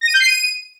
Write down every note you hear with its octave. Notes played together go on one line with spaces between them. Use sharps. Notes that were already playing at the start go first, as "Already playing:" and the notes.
A#6
D#7
G6
C7
D#7